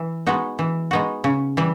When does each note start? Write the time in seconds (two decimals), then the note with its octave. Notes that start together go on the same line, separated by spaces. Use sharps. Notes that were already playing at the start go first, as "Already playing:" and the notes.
Already playing: E3
0.26 G#3 B3 D#4 F#4
0.59 E3
0.91 G#3 B3 D#4 F#4
1.24 C#3
1.57 E3 G3